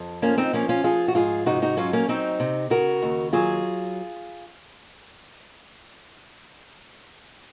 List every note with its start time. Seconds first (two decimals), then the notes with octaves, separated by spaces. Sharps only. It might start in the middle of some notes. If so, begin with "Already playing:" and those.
Already playing: F2
0.22 F3 A#3 C#4
0.38 C4 D#4
0.53 F3 A#3 C#4
0.69 C#4 F4
0.84 F3 F4 G#4
1.08 F#4
1.15 G#2 F4 G#4
1.46 C3 D#4 F#4
1.62 D#4 F#4
1.77 F#3 C#4 F4
1.93 A#3 C#4
2.08 F#3 C4 D#4
2.40 C3
2.70 C#3 F#4 A#4
3.03 D#2
3.33 F#3 F4 G#4